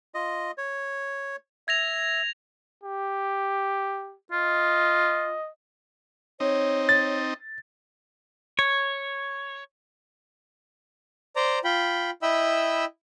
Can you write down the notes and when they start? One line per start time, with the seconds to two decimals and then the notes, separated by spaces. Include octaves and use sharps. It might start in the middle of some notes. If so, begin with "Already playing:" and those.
0.15 F4 D#5
0.58 C#5
1.68 E5 G#6 A#6 F7
2.83 G4
4.32 F4 D#5
6.40 C4 D#4 C#5
6.89 A6
8.59 C#5
11.36 C5 D5 A#5
11.64 F4 G5 B5
12.22 E4 D#5 E5 G5 B5 E6